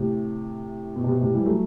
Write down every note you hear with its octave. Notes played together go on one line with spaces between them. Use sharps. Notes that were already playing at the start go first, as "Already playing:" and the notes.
Already playing: A2 C3
B2
C3
B2
A2 C3
E3 G3
F#3 A3